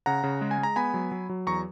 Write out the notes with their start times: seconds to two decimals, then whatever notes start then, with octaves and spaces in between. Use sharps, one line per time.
0.06 C#3 F#5 A#5
0.24 C#3
0.41 G#3
0.51 G#5
0.58 G#3 A#5
0.76 B3 G#5 B5
0.94 F#3
1.12 F#3
1.29 F#3
1.47 E2 A#5 C#6